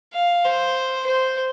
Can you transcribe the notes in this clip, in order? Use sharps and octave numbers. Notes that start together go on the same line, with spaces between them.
F5
C5
C5